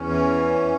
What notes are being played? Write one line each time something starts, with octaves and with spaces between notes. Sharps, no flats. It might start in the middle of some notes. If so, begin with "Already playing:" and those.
Already playing: E2 C#4
E3